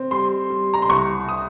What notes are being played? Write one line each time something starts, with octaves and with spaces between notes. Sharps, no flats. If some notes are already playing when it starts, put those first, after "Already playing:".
Already playing: C4
G3 C6
G3
A#5
C6
C2 C#6
D#6